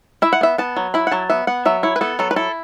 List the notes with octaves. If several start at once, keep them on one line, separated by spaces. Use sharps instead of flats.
E4 E5
F#5
B3 E5
B3 A5
F#3
E4 B5
F#5
F#3 A5
B3 E5
B3 F#5
F#3 E5
E4 C#5
B4
B3 A4
F#3 A4
B4
E4 A4